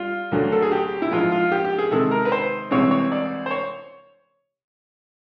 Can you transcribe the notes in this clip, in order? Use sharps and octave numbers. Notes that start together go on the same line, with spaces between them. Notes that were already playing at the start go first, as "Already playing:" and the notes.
Already playing: G3 F4
D2 D3 F#3 A3
A4
G#4
G4
E4
G#2 F3 G#3 F4
F4
G4
G4
G#4
C3 D#3 G#3 A4
A#4
B4
C5
C2 C3 E3 G#3 C4 C#5
C#5
D5
C5
C#5